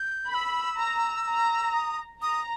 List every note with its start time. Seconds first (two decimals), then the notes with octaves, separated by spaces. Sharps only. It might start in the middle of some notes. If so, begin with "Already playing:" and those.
Already playing: G6
0.30 B5 G6
0.34 E6
0.78 A#5
1.26 A#5
1.74 D#6
2.22 A#5 D#6